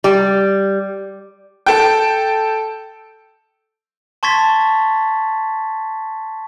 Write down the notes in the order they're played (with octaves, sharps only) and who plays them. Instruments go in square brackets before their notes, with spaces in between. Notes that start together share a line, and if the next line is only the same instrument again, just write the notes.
[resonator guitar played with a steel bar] G3
[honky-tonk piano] A4 G5
[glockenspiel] A5 C6 C#6 G#6 A6 B6